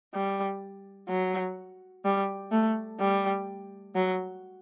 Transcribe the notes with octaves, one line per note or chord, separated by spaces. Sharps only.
G3
F#3
G3
A3
G3
F#3